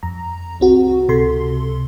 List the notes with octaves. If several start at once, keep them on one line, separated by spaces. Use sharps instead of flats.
F2 A#5
C2 C4 F#4
C#2 C3 A4 C6